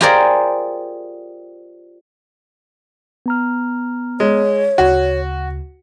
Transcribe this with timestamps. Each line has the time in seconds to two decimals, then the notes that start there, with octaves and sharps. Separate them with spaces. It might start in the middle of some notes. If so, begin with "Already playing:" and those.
0.01 F4 G4 G#4 A#4 C5 D5
3.26 B3 A#5 F6
4.20 G#3 C#5
4.78 D2 C#3 F#4